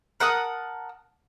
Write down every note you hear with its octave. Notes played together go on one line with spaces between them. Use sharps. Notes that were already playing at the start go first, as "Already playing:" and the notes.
A#4 F#5 A5 D#6